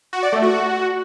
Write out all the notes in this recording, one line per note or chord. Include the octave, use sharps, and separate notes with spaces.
F#4
D5
A3
F#4